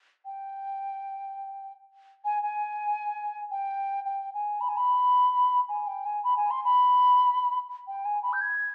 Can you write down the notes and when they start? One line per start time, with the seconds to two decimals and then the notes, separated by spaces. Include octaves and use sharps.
0.26 G5
2.25 G#5
2.43 G#5
3.51 G5
4.06 G5
4.34 G#5
4.61 B5
4.69 G#5
4.77 B5
5.69 G#5
5.87 G5
6.06 G#5
6.24 B5
6.37 G#5
6.51 C6
6.65 B5
7.88 G5
8.05 G#5
8.23 B5
8.33 G6
8.41 G#6